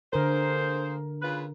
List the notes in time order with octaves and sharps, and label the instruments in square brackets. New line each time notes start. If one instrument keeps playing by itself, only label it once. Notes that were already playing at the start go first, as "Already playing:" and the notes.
[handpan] D3 A#4 [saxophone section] A#3 G#4 C5
[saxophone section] C#3 F4 B4